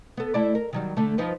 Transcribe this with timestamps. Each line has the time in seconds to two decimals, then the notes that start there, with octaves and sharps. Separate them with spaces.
0.17 B3 A4
0.34 A3 E4 D5
0.55 A#4
0.73 D#3 F#3 G3
0.97 D3 A3
1.18 F3 D#4 B4